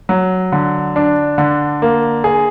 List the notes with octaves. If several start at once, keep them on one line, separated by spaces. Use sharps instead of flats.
F#3
D3
D4
D3
A#3
G#4